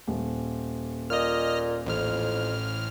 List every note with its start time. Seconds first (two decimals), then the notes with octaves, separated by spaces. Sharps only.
0.07 D#1
1.10 A#2 D#5 F6
1.87 A1 F2 F6